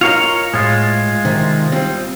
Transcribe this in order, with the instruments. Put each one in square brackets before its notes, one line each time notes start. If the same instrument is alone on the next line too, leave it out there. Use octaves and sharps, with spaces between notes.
[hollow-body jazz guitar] F4 D#5 [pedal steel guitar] A#4 C#5 F5
[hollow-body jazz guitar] A2 [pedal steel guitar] G#3 F4
[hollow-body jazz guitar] C3 D#3
G3 C4 F4